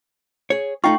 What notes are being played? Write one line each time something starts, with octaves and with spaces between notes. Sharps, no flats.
G#4 C#5
A3 D#4 F4 G5 C#6